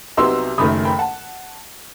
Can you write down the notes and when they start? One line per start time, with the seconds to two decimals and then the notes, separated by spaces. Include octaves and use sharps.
0.17 C2 C3 F#3 B3 D#4 C6 E6
0.58 F#1 F#2 D#3 A3 B5 D#6
0.85 G5 B5
0.99 F#5 A5